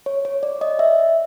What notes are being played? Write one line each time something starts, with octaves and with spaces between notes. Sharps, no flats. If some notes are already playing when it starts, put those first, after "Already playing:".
C#5
C#5
D5
D#5
E5